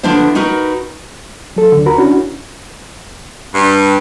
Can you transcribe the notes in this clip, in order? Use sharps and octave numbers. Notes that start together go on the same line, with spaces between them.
D3 F3 B3 D4 E4 C5
D#4 F#4 A#4 B4
F#3 A4
D2 D3
F#4 A#4 A#5 B5
C#4 D4 E4 F#4
G2